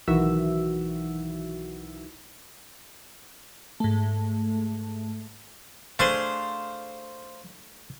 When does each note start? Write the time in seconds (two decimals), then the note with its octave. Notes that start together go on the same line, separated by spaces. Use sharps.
0.08 B1 D#3 E3 F#4 E5 E6
3.80 G#2 A3
5.99 A3 D4 G#4 C5 F5